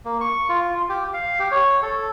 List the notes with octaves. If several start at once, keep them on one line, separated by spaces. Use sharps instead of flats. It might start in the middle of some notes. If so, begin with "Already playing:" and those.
A#3
C#6
F4
G4
F5
G4
C#5
A4